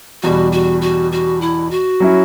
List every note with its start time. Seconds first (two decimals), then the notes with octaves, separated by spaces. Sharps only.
0.23 E2 B2 G3 F#4
0.52 F#4
0.82 F#4
1.12 F#4
1.41 E4
1.71 F#4
2.00 F#3 C#4 E4